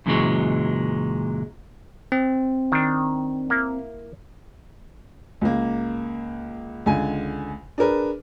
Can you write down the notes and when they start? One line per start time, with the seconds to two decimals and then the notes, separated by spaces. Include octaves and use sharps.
0.06 F#2 A#2 C#3 E3 F#3 G#3
2.12 C4
2.72 D#3 D4
3.50 A#3 E4
5.41 C#2 A#3
6.86 C#2 D3 G#5
7.78 D4 G#4 A#4 B4